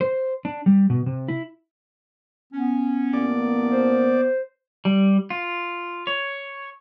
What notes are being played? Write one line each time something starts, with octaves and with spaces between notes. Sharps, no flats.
C5
D4
G3
B2
C3
E4
B3 C#4
A1 A#3 D5
C5
G3
F4
C#5